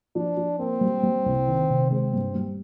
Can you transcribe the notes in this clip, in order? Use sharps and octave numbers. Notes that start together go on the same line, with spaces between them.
F3 D4
F3
A#3 C4
G3
G3
C2
D#3
C3
G#3 C4
G2
G3